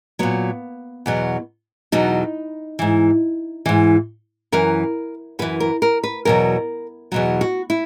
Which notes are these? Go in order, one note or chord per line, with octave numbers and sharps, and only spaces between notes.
A#2 F#3 B3
E2 B2 F#3
E2 B2 F#3 D#4
G#2 E3
G#2 E3
F#2 E3 A#4
F#2 E3 B4
A#4
A#4
B4
E2 B2 F#3 A#4
E2 B2 F#3
F#4
E4